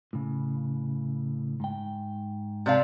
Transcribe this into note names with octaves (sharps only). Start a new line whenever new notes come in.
A2 C#3
G#2 G5
C3 D5 F5